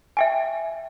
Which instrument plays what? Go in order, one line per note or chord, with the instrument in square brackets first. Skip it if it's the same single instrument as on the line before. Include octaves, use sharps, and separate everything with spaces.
[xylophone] E5 G5 G#5